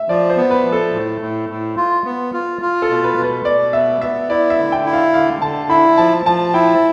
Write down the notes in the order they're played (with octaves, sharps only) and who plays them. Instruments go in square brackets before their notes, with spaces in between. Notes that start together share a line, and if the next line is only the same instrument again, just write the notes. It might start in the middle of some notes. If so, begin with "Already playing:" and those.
Already playing: [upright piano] E5
[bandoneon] F3 [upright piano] D5
[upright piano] C5
[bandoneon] B3
[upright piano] B4
[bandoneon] F3
[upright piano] A4
[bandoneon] A2
A2
A2
F4
B3
F4
F4
[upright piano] A4
[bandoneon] B2
[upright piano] B4
[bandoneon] B2
[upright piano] B4
[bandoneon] B2 [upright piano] D5
[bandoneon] B3 [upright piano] E5
[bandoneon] B3 [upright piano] E5
[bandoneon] E4 [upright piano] D5
[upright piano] E5
[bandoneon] D3
[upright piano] G5
[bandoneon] E4
[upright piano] F5
[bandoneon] D3 [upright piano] F5
[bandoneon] D3 [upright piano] A5
[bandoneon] E4 [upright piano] B5
[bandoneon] F3 [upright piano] A5
[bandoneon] F3 [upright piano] A5
[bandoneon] E4 [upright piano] G5